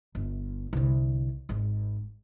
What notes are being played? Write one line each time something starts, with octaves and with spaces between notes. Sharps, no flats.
G1
C2 D3
G#1